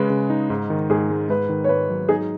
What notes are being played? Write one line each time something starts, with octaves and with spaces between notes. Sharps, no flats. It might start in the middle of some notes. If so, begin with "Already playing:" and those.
Already playing: C#3 G#3 B4
C#3
D#4
G#2
D#3
G#2 G#4
G#3
G#2 B4
D#3
C#5
G#2 B4
F#3
D#4 G#4